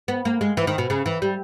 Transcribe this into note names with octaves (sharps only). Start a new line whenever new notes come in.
B3
A#3
G#3
E3
D#3
B2
C#3
E3
G3